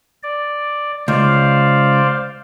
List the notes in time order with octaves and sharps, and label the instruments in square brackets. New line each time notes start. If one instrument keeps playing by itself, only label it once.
[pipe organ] D5
[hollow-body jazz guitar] C#2 [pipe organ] C5 D5 F5